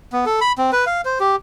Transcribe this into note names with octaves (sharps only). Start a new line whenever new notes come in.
B3
A4
B5
C4
B4
F5
C5
G4